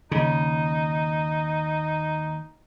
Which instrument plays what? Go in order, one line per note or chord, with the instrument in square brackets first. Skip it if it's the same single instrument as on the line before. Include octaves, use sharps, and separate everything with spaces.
[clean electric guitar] D#2 D#5 [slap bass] C#3 [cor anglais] D#4